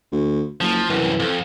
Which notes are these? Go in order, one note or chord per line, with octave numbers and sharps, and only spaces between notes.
D2
F#1 F3
C2 F#2 E3
F2